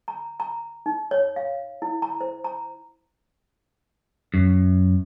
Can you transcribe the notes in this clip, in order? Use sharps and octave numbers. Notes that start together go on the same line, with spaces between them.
A#5
A#5
D#4
C#5
F5
E4
A#5
C5
A#5
F#2